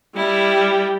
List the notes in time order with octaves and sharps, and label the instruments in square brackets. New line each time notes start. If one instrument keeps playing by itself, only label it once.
[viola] G3 [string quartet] E4